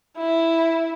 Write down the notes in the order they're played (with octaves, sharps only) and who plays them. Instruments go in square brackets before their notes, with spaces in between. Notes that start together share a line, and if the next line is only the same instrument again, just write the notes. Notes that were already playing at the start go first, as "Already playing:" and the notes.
[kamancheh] E4